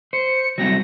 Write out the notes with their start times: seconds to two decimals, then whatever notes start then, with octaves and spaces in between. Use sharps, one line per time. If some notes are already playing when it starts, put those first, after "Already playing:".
0.13 C5 C#7
0.58 F#3 G3 C4 A#6